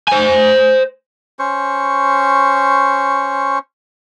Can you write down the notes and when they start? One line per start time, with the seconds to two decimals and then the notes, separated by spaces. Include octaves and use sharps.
0.08 C5 G#5
1.39 C#4 C5 C#6